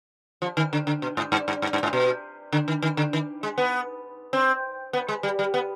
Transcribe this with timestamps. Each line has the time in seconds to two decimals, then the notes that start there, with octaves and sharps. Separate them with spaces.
0.42 F3
0.57 D#3
0.73 D3
0.87 D3
1.02 B2
1.17 G#2
1.32 G2
1.48 G2
1.62 G2
1.73 G2
1.83 G#2
1.93 B2
2.52 D3
2.68 D#3
2.82 D#3
2.97 D3
3.13 D#3
3.43 G#3
3.58 B3
4.33 C4
4.93 B3
5.08 G#3
5.23 G3
5.39 G3
5.54 B3